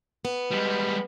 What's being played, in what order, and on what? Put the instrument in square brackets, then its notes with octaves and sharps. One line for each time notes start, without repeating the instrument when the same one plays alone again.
[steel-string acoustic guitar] B3
[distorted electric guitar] G3 G#3